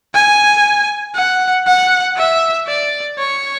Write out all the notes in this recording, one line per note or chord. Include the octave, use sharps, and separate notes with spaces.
G#5
F#5
F#5
E5
D5
C#5